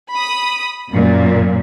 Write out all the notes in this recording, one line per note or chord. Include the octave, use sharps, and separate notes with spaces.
B5 D#6
F#2 A#2